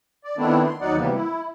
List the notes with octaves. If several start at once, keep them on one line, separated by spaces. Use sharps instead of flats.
D5
D#3 A3 B3 C4 D4 E4
C6
D#2 F#3 D#4 D5 F#5
C3 E3 G3 A#3 B3
E4